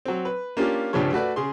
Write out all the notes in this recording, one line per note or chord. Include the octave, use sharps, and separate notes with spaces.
F#3 C4
B4
A#3 C#4 D4 F4 G4
C#2 G2 C3 F3 G3 C#5
A3 F#4 B4 D5
C#3 G#4 C6